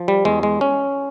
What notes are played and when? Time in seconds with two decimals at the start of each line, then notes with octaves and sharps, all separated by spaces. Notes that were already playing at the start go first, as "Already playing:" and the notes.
Already playing: F3
0.08 G3
0.25 E2 G#3
0.43 G#3
0.61 C#4